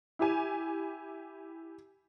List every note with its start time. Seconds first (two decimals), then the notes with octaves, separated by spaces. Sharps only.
0.19 E4 G4 G#5